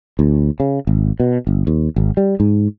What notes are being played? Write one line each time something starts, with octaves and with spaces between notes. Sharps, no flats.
D2
C#3
G#1
B2
G1
D#2
G#1
G3
G#2